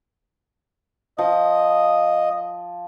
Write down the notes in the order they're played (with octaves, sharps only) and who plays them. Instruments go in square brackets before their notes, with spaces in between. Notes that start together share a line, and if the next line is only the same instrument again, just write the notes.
[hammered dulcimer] F3 [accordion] D#5 D#6